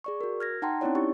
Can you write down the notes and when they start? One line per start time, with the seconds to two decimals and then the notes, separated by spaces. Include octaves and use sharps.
0.04 G#4 D5 C#6
0.21 F#4 A#4
0.40 F6 G#6 A#6
0.62 D#4 F#5 G5 A5 A#5 C6
0.81 C4 C#4 D#4 E4 C#5 D5
0.95 D#4 E4 G4 C#6